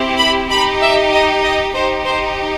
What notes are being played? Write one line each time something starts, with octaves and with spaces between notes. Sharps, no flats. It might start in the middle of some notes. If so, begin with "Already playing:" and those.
Already playing: C4 E4 G4
B5
D#4 G4 B5
E5
D#5
D#5
D#4 G4 C5
C5